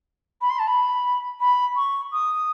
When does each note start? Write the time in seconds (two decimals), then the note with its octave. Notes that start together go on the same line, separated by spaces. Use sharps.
0.41 B5
0.49 C6
0.59 A5
0.67 B5
1.40 B5
1.76 C#6
2.12 D#6